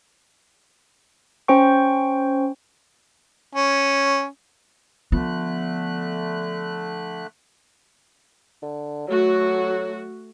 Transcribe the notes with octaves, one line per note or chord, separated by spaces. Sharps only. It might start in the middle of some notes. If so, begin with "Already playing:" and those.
C#4 C5 G5 C#6
C#4
D3 F3 A3 B3 F#6
D3
F#3 A3 F#4